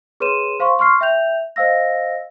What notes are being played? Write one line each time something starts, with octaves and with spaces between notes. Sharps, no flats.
G#4 B4 C#5 C6 D#7 E7
C5 F5 C6 C#6
C6 C#6 F6 C7
E5 G5 G6 F7
C5 D#5 F5 E6 A#6